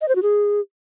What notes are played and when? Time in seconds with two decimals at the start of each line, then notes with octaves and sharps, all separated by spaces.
0.01 D#5
0.08 C5
0.16 F#4
0.23 G#4